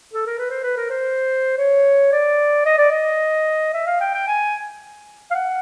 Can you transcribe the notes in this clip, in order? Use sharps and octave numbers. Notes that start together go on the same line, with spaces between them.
A4
A#4
B4
C5
B4
A#4
C5
C#5
D5
D#5
D5
D#5
E5
F5
G5
G5
G#5
F5
F#5